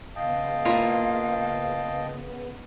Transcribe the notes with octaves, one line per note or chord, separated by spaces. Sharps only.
C#3 B3 D#5 F5 G5 A5
A#3 E4 F4